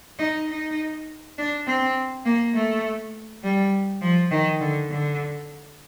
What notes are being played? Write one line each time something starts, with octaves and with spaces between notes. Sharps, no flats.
D#4
D#4
D4
C4
A#3
A3
G3
F3
D#3
D3
D3